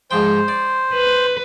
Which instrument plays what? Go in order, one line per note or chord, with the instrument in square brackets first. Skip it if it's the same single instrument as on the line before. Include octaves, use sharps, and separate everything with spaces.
[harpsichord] G#2 F3 G5 [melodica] C5
[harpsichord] D5
[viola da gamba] B4